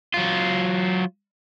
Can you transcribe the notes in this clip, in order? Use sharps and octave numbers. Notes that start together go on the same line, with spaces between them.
F#3 F4